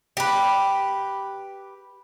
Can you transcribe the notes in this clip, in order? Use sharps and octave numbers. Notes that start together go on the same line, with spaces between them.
G4 B4